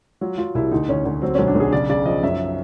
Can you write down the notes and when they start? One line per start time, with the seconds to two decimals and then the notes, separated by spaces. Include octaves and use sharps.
0.21 F#3 F4
0.38 F#3 F4
0.55 C2 E4
0.71 D2 D#4
0.89 D2 C#4
1.05 D2 C#4
1.22 F#3 C4
1.35 B1 C#4
1.48 D4
1.55 B1 G#4
1.72 C#3 D5
1.89 C#3 D5
2.05 F3 D#5
2.23 F#2 E5